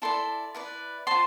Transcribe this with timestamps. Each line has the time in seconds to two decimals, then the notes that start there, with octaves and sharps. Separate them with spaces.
0.02 E4 A4 D5 A5 C6
0.55 E4 B4 D5
1.07 F4 C5 A5 C6